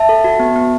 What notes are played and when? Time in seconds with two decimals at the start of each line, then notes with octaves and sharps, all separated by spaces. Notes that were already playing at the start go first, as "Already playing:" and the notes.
Already playing: E5 A5
0.09 A4
0.24 F#4
0.40 B3
0.56 B3